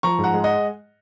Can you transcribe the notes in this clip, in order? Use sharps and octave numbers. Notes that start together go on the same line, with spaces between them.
F3 A#5 C#6
G#2
F#5 A#5
G#3
D#5 F#5